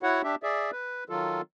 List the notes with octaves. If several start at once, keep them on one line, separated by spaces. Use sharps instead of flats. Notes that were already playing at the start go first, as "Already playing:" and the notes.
E4 F#4 C#5 F#5
D4 G4 E5
G#4 D5 E5
B4
D#3 F#3 F4 A4